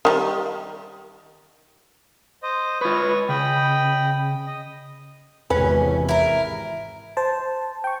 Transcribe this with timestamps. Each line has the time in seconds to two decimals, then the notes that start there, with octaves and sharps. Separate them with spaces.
0.05 D#3 G3 D#4
2.43 C5 D#5
2.81 F4 B4 C#5 D#5 C#6
3.29 C#3 D#5 G5 B5
4.46 D#5
5.50 G#1 E2 C3 C#4 B4
6.09 E4 A#4
7.17 C5 A5
7.84 G5 C#6